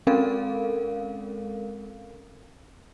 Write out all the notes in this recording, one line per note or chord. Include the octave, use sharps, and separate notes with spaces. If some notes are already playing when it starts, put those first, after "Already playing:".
G#3 C4 C#4 A4 A#4 F5